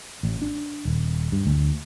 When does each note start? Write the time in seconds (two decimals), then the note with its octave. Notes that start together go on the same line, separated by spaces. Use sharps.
0.23 A1
0.42 D4
0.85 D#1
1.32 G2
1.46 D2